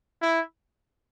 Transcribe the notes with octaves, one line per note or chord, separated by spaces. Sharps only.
E4